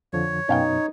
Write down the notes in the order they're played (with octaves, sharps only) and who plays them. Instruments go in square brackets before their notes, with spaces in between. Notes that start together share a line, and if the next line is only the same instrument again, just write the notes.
[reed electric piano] F2 D3 F3 [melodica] C#5
[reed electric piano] F#2 B2 F#3 [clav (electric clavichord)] C#4 F5 G5 [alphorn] D#4